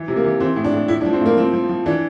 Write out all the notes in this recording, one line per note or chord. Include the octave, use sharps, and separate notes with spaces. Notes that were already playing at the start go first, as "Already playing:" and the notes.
Already playing: E3
C3
A#3
E3
E3 C4
A2
D4
A2
A2 E4
D4
F3
C4
A2 A#3
F3 C4
F3
F3
E3 D4